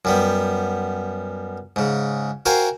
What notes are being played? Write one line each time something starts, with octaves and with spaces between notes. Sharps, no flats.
F#2 G3 B3
G#2 C#3
F#4 A#4 C5 F5 G5 G#5